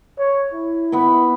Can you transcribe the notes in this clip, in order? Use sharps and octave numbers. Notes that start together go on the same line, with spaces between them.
C#5
E4
B3 B5